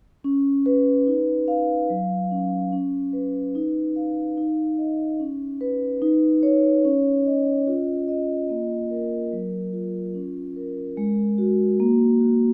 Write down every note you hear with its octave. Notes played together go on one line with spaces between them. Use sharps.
C#4
B4
D#4
F5
F#3
C#4
C#4
B4
D#4
F5
D#4
D#5
C#4
B4
D#4
C#5
C#4
D#5
F4
D#5
A#3
A#4
F#3
F4
C#4
A#4
G#3
F#4
A#3
F#4